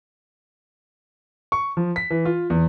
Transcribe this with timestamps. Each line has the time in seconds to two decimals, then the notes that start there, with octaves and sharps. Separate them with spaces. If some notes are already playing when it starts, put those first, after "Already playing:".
1.52 C#6
1.77 F3
1.96 B6
2.10 E3
2.25 F4
2.50 E2